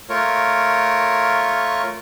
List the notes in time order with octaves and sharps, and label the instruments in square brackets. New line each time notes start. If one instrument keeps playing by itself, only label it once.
[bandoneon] A3 F4 A#4 C#5